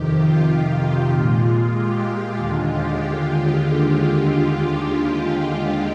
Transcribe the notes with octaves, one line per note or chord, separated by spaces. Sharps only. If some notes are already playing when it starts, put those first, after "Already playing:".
Already playing: F2 C3 D#3 G4
F4
A#2 G#3
G4
D#2 D3 G#3 F4
G4
F4